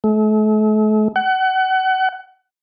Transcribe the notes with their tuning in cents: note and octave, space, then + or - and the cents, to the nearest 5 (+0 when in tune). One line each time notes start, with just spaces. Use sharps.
A3 -40
F#5 +30